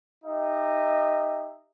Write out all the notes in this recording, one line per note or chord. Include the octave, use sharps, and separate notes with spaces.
D#4 G4 D#5 E5